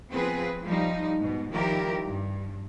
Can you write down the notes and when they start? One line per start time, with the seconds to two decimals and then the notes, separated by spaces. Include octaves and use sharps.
0.11 F3 B3 C4 F4 G#4 B4
0.64 F3 G3 D#4
1.20 G#2 B2
1.53 D#3 F3 G3 E4 G4 A#4
2.06 G2